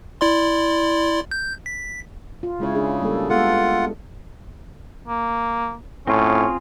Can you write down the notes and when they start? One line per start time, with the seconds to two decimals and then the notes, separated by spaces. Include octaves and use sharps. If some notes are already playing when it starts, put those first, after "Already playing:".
0.21 E4 D5 C6
1.31 G6
1.66 B6
2.43 F4
2.60 C#3 G#3 E4 C#5
2.75 D4 G#4
3.01 G3 A#3 A4
3.30 G#3 B3 F4 A4 F#5
5.08 A#3
6.07 A2 C4 C#4 F4 G#4